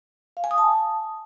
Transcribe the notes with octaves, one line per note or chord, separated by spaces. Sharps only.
F5
G#5
D#6
A5